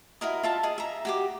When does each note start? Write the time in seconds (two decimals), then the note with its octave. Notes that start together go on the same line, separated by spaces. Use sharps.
0.21 E4 F#4 A#4 D#5
0.43 F4 E5 A5
0.63 G#4 D#5
0.78 E5 A#5
1.05 F#4 G4 D6